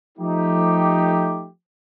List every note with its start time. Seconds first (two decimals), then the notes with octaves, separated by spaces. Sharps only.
0.18 F3 A3 D#4 G4